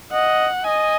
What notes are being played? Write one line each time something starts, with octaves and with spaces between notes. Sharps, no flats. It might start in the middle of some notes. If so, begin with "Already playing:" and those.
D#5 F#5
D#5 G#5